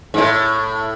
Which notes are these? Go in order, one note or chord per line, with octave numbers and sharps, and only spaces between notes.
G#2
A2